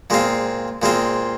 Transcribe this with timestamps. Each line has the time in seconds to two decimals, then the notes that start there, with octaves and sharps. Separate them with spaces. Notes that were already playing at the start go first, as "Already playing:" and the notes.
0.10 A#2 G#3 C4 F4
0.82 A#2 G#3 C4 F4